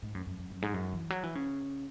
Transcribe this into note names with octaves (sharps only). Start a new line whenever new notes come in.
G#2
F#2
F#2
F#2
F#2
G#2
F#2
E3
F#3
E3
C#3